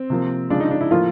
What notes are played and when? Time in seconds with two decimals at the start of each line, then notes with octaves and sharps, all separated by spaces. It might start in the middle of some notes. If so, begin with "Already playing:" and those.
Already playing: C4
0.10 C3 F3 A#3
0.50 C#3 F3 G#3 D4
0.60 D#4
0.71 D4
0.81 E4
0.91 A2 F3 A#3 F4